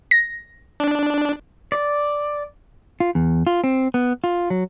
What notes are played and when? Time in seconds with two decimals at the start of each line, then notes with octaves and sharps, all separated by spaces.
0.11 A#6
0.80 D4
1.72 D5
3.00 F4
3.15 E2
3.47 F4
3.64 C4
3.94 B3
4.24 F4
4.50 F#3